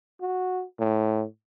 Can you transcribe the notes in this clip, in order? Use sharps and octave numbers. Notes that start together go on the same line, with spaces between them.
F#4
A2